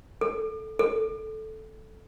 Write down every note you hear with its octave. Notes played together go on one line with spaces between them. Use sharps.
A4
A4